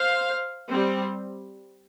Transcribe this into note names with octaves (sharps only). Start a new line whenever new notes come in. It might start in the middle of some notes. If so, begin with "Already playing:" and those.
Already playing: C5 F5
G3 C4